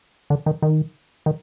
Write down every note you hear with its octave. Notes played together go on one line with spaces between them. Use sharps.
D3
D#3
D#3
D#3